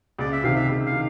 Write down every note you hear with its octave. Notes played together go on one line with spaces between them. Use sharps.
C#2 D5
E5
C3 D#3 F5
E5
C#2
F5
D#3